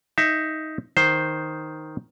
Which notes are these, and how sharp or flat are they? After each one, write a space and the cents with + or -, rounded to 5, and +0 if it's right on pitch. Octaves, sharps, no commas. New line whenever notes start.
D#4 +10 E5 +20
D#3 +0 C5 +0